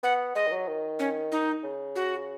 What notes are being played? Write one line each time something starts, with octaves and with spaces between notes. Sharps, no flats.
B3 F#5
G#3 D#5
D#3
F#3
D#3
C#4
D#4
C#3
F#4